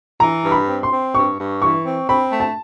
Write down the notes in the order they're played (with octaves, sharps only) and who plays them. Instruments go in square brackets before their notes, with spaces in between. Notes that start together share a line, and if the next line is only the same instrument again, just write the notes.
[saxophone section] E3 [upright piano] A#5
[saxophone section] G2
[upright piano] B5
[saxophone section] C4
[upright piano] C6
[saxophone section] C4
[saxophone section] G2 [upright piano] C#6
[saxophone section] G2
[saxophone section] E3 [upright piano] C#6
[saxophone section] C4
[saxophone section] C4 [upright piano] B5
[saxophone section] A3
[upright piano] A5